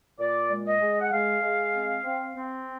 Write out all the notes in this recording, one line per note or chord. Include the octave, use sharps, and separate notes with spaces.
A#2 D5
G#3
D#5
G#3
F#5
G#3 F5
G#3
C4
C4
C4